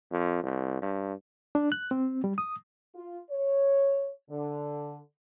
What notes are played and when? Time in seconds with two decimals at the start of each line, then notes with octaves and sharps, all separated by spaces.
0.11 F2
0.43 C2
0.82 G2
1.55 D4
1.72 F#6
1.91 C4
2.24 G3
2.38 D#6
2.95 F4
3.31 C#5
4.30 D3